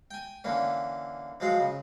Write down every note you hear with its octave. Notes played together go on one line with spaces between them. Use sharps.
G5 G#5
D3 E3 A#3 C#4
F3 F#3 G#3 F#4 F5 F#5
C#3